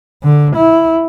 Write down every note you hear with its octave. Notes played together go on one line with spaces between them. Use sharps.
D3
E4